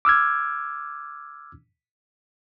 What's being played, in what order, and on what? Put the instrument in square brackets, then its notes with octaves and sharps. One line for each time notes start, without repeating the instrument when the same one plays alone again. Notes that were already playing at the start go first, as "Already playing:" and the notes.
[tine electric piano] D6 E6 F6 G#6